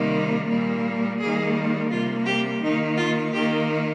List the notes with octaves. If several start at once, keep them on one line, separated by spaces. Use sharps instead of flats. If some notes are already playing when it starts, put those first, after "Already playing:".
Already playing: C3 D#3 G3 A#3
A#2 G3 A#3
D#3 G3 A#3 G#4
C3 G3 A#3 F4
G4
D#3 A#3 D#4
F4
D#3 A#3 G4